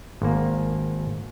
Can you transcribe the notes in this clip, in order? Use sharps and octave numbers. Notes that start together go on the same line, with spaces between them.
G#1 A#3